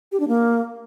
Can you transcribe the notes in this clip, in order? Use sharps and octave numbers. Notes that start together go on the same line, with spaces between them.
G4
D4
A#3